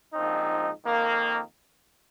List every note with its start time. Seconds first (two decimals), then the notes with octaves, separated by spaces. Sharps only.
0.14 A#1 G#2 F3 C4 D#4
0.83 F2 D#3 A#3